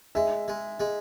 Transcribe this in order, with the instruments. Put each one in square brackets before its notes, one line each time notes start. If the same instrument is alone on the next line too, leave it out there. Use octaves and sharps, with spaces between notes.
[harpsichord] G#3 [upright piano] E5
[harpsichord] G#3
G#3